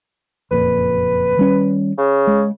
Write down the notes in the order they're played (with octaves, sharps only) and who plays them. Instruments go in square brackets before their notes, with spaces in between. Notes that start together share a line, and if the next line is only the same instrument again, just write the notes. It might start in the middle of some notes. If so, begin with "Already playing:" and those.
[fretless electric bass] F#1 F2 A#2 [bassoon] B4
[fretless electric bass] D#3 G3 C#4
[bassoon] C#3
[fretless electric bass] G#3